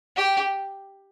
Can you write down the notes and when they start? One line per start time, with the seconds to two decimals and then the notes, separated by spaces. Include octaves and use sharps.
0.16 G4